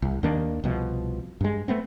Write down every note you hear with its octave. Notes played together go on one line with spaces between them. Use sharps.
C2
D#2 D#3 A#3 D4
C2 B2 F3
G2 G#3
A3 B3 C4